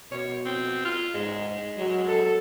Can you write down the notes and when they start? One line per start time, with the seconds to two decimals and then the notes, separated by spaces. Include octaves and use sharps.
0.12 B2 C#5
0.46 C4
0.85 F4
1.15 G#2 G#3
1.78 F#3
2.07 A4